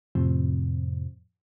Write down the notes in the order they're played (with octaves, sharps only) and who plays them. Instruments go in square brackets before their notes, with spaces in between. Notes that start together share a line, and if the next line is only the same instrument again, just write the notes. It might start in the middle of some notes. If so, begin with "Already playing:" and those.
[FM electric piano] F2 A2 C3 F3 C4